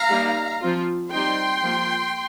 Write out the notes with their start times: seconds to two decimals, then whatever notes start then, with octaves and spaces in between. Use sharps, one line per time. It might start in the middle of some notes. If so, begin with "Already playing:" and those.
Already playing: F5 A#5
0.10 G3 A#3 D#4
0.62 F3 C4 F4
1.11 G3 C4 D#4 G5 C6
1.63 F3 A#3 F4